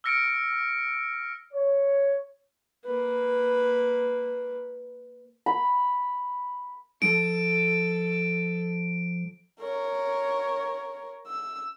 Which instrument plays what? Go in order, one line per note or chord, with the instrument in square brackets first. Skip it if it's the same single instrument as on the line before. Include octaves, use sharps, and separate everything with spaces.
[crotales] E6 F6 A#6 C#7 D7
[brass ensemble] C#5
[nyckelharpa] A#3 B4
[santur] B5
[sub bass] F3 [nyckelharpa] A4 [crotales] D7
[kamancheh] A#4 C#5
E6